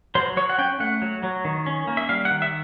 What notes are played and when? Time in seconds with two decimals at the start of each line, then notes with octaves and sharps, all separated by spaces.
0.15 F#3 C5
0.37 F#3 C#5
0.50 F#5
0.58 C#4 G5
0.80 A3 F#5
1.02 F#3
1.23 F#3
1.45 D#3
1.66 C#4
1.87 A#3
1.97 E5
2.09 G3 F5
2.25 F#5
2.31 D#3
2.42 E5